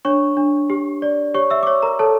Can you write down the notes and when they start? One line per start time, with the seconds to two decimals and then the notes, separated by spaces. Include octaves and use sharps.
0.05 D4 C#5 C#6
0.37 D4
0.70 G4
1.02 D5
1.34 G4 C#5 C#6
1.50 E5 E6
1.63 D6
1.67 C#5 C#6
1.82 A#4 A#5
1.99 A4 C#5 A5